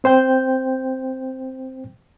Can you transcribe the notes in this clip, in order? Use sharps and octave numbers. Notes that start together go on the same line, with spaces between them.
C4 C5 G5 G6